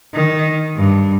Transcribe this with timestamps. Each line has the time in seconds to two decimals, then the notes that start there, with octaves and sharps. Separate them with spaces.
0.14 D#3
0.77 G2